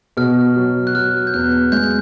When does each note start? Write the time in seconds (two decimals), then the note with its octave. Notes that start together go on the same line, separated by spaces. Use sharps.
0.17 B2 F6
0.56 F#3
0.87 F#6
0.95 F#3 F6
1.27 G6
1.34 E2 F#6
1.72 G#3 G6